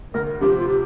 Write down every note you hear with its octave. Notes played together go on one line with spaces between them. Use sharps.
D2 A#4
C3 F3 C4 G4
F4
G4